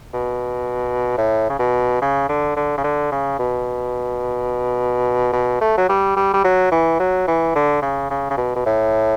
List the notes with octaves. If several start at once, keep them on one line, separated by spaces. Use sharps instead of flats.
B2
A2
C#3
B2
C#3
D3
D3
C#3
D3
C#3
B2
B2
A3
F#3
G3
G3
G3
F#3
E3
F#3
E3
D3
C#3
C#3
C#3
B2
B2
A2